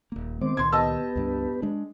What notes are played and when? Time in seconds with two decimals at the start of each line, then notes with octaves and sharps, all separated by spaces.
0.12 D#1 A#3
0.41 D#3 G#3 B3 C4 C5 D6
0.57 C#2 A#2 D#3 C6 G#6
0.72 B3 G4 B4 D#5 A5 E6
1.16 C#2 G2 D4
1.62 G#3 D4